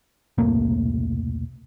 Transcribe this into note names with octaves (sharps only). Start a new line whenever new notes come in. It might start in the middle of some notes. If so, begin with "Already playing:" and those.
E1 C2 A2 A#3